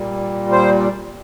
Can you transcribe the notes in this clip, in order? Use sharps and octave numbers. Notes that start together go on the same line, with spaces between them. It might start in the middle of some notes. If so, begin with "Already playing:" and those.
Already playing: A#2 G3
C5